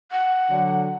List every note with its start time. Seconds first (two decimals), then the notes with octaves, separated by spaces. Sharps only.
0.11 F#5
0.50 D3 F#3